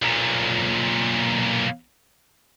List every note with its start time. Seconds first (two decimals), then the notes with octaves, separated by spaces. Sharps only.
0.02 B1 A#2